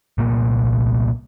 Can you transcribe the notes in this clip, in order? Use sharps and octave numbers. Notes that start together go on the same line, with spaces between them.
C2 A#2 A#3